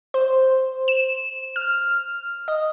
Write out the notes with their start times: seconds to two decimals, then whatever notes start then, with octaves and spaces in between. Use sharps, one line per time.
0.14 C5
0.88 E7
1.56 F6
2.48 D#5